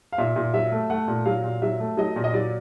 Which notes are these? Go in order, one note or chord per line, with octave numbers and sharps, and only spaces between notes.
F5
A#2 E5
A#2
F#3 E5
A3
A3 F#5
A#2
F#3 F5
A#2
F#3 E5
A3
F#3 D#5
A#2
D#5
F#3 D5